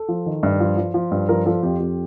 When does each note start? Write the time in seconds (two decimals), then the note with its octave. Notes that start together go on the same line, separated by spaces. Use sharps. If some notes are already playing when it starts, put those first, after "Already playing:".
Already playing: A4
0.09 F3
0.26 D#3
0.43 G2
0.60 F3
0.77 F3
0.94 F3
1.11 G2
1.29 F3 A#4
1.46 F3 A4
1.63 F2 G4
1.80 F2